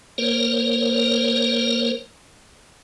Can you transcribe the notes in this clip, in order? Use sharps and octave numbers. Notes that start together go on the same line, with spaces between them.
A#3 A#4 C5 C#5